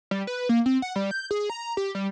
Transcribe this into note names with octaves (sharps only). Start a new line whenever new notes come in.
G3
B4
A#3
C4
F#5
G3
G6
G#4
A#5
G4
G3